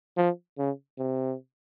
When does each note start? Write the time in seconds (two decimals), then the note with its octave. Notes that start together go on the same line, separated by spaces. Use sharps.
0.17 F3
0.58 C#3
0.98 C3